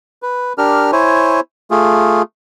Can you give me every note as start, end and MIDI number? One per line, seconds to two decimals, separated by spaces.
0.22 0.53 71
0.58 0.91 62
0.58 0.91 67
0.58 0.91 70
0.58 0.91 89
0.92 1.40 64
0.92 1.40 72
0.92 1.40 73
0.92 1.40 80
1.71 2.22 57
1.71 2.22 65
1.71 2.22 68